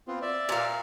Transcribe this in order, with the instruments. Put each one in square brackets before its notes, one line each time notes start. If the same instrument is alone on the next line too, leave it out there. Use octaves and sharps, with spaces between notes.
[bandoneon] B3 C4 F4
D5 E5
[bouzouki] A#2 F5